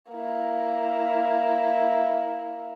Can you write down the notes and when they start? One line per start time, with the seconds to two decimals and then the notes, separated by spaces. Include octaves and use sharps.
0.12 A#3 E4